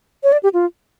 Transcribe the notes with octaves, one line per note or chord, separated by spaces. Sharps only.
C#5
D5
G4
F4